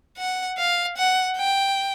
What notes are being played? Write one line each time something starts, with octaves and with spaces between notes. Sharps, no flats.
F#5
F5
F#5
G5